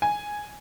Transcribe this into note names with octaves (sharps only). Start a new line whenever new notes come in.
G#5